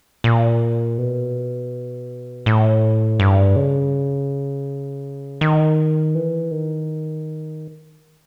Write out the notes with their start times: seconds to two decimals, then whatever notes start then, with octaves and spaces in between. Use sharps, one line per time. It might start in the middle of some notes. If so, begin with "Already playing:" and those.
0.24 A#2
0.98 B2
2.46 A2
3.20 G2
3.56 C#3
5.41 D#3
6.15 E3
6.51 D#3